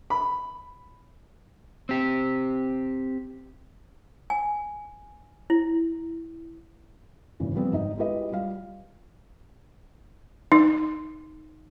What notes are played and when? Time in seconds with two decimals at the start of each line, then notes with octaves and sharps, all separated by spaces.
0.10 B5
1.89 C4 G4
4.30 G#5
5.50 E4
7.40 G#1 A#2 C#3 E3
7.55 F3 G3 B3 C4
7.72 G#1 D#4 D#5
7.97 G#3 E4 F4 G4 B4 D#5
8.32 G3 F4 F5
10.52 D#4